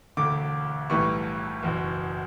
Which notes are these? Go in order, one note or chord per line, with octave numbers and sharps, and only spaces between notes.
E1 D2 D3 D6
B1 A2 E3 G3 C#6
F#1 E2 B2